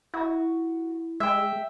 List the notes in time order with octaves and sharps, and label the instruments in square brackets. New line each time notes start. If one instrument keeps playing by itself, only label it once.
[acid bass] E4 [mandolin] F#4
[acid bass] G#3 [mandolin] E5 G5